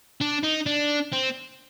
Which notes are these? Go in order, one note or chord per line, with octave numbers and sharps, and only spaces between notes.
D4
D#4
D4
C4